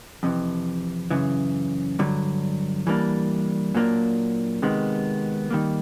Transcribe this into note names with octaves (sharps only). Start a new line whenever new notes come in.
F2 C3 E3
F#2 C#3 E3
G2 D3 F#3
E3 G3 A#3 D4
A#2 F#3 A#3 D4
C3 D#3 G#3 B3
D#3 G3 A#3